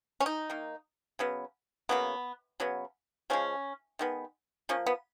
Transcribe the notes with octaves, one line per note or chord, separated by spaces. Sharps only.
C#4
D#4
D#3 A#3
C#3 F#3 B3
C#3 F#3 A#3 B3
C#3 F#3 B3
C#3 F3 G#3 C#4
D#3 G#3 B3
F3 A#3 C#4
B3